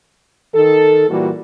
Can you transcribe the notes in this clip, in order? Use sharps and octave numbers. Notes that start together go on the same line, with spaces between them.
D#3 A4
A#2 E3 G3 A#3 F#4